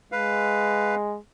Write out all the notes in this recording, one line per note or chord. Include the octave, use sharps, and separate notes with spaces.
G#3 B4 F5